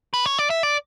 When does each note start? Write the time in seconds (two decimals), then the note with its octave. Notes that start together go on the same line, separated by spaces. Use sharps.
0.14 B4
0.25 C#5
0.38 D5
0.50 E5
0.63 D5